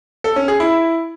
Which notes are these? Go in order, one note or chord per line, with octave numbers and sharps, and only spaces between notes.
A4
C#4
G#4
E4